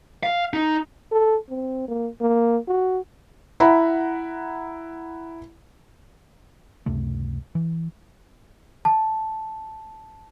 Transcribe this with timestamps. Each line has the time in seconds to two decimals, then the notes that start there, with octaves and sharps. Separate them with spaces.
0.23 F5
0.54 D#4
1.12 A4
1.50 C4
1.88 A#3
2.21 A#3
2.68 F#4
3.60 E4 F#5 A#5 B5
6.86 C#2 F#2 C3 A3
7.55 E3
8.85 A5